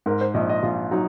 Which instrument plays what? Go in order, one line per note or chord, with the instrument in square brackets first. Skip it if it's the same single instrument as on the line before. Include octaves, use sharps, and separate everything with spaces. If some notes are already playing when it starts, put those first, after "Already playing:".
[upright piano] G#2 [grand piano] A#4
[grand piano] C5
[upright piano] A#1 [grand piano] D#5
[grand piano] D#5
[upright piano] A#1 [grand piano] F4
[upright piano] F#3 [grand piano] D#4